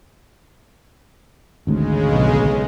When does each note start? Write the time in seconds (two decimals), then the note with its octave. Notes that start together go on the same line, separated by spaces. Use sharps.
1.67 G#1 D2 G#2 C#3 G#3
2.10 B1